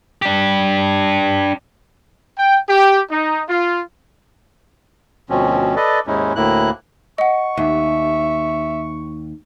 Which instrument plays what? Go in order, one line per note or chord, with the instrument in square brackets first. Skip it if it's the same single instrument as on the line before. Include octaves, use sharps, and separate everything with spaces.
[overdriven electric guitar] D4 G4
[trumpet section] G5
G4
D#4
F4
[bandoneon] D2 B2 F3 C4 C#4
A4 B4 D5 D#5
D#2 G#2 G#3 C#4 D#4 E4
D2 A2 A#3 E4 F#6
[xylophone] D#5 F#5 [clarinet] C#6
[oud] D#2 [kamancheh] E5